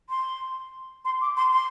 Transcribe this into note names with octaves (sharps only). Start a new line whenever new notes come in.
C6
C6
D6
C6
C6